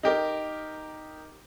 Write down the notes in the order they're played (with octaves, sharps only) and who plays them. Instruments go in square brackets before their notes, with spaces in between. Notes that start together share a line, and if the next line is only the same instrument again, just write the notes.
[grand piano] D#4 G4 A#4